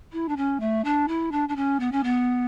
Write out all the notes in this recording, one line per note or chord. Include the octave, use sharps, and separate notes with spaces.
E4
D4
C#4
A3
D4
E4
D4
D4
C#4
B3
C#4
B3